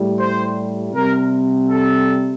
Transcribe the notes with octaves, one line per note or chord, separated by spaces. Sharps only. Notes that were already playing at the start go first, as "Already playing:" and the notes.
Already playing: A2 G3
C5
C3 G3 A#4
A4